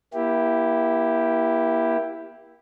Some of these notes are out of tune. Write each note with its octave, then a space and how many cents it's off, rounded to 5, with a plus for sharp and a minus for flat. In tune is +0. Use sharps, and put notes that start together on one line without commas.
A#3 +35 E4 +0 G4 +0